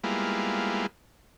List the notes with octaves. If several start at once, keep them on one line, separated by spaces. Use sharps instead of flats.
G3 G#3 A#3 B3 E4 F4